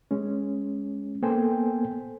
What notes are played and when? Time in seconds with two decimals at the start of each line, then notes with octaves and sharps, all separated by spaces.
0.11 G#3 C#4
1.22 A#3 B3 A4 C5 G5 G#5